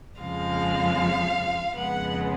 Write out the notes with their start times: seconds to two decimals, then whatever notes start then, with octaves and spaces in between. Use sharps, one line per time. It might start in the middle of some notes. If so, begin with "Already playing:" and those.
0.21 F2 C#3 F3 G#3 F5
1.75 F2 C#3 G#3 B3 F#5